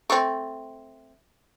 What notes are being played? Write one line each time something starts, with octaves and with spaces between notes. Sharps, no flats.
A3 C4